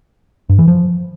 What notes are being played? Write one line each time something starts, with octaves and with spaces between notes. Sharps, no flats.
G2
E3
F3